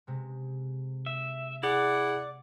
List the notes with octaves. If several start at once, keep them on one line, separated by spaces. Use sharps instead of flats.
C3 G#3
E5
E4 G#4 D5 F#5